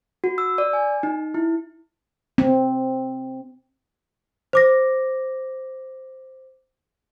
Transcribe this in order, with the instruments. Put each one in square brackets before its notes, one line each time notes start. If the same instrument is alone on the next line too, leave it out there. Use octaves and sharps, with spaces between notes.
[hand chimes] F#4
E6
D5
G#5
D#4
E4
[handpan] C4
[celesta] C5 D6 A#6